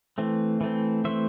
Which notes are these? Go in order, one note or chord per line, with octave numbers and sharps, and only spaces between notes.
E3 A3 C4
E3 A3 C4
E3 A3 C4 C5 E5